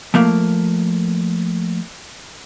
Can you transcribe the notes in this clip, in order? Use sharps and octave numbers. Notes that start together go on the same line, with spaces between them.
F3 A3 A#3